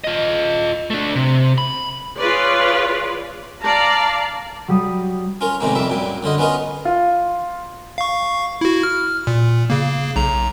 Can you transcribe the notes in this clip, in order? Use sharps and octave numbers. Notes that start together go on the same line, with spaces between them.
F4 D#5
A3 D4
C3
B5
F4 G#4 B4 C#5 D5
D5 F5 A5 A#5
F#3 G3 D#6
C#4 F4 A#4
E2 A2 C3 D#3 G#3 A#3
F2 G3 A#3 E5
F#2 A#2 G3
F#2 D3 F4 D#5
B3 C#4 F4 A#4 D#5
F4
F5 C#6
E4 F#4
F6
A#2
C#3 A#3
B1 A#5